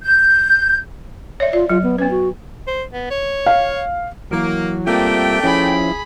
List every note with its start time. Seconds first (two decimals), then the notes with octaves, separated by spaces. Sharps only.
0.03 G6
1.40 C#5 D5 E5
1.53 F4 D5
1.70 F#3 F4
1.83 B3
1.98 B3 C#4 B4
2.11 F#4
2.67 C5
2.93 B3
3.10 C#5
3.46 F5
4.31 E3 F#3 A#3 E4
4.87 G3 A3 A#3 C4 F4 D5 E5 G5
5.44 F3 C#4 E4 G#4 C#5 G#5 B5